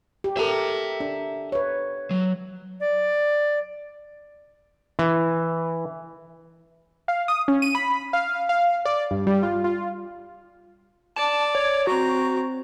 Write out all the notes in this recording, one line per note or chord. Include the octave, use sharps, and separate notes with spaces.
G4
G4 A4 A#4 E5 A#5
D4
B4 C#5
F#3
D5
E3
F5
D#6
C#4
D#7
B5
F5
F5
D5
G2
G3
F4
F4
D5 A5
C#5
C4 F#4 A#5